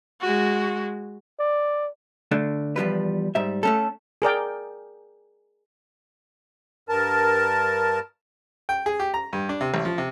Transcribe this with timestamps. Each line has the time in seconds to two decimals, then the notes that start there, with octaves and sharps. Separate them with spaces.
0.21 G#3 F#4
1.40 D5
2.31 D3 A3 D4
2.76 E2 F3 G3 B4
3.35 G#2 G3 E5
3.63 A3 C#4 A4
4.22 G#4 A#4 D5 G5
6.89 G2 A#4 A5
8.69 G5
8.86 G#4
9.00 G4
9.14 A#5
9.33 G2
9.49 D4
9.61 C3
9.74 A1
9.85 F3
9.98 C3